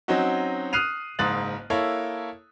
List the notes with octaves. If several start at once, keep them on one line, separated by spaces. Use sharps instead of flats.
F#3 C4 C#4 D#4 F#4
D#6 F6 F#6 C7 D#7 F7
F#1 G#2 D#6 F#6 A6 F#7
A#3 E4 A4 C#5